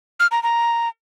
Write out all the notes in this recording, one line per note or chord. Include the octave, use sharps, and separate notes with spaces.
F6
A#5
A#5